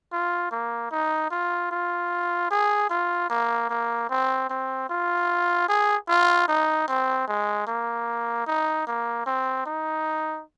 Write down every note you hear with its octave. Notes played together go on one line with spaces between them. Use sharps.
F4
A#3
D#4
F4
F4
G#4
F4
A#3
A#3
C4
C4
F4
G#4
F4
D#4
C4
G#3
A#3
D#4
A#3
C4
D#4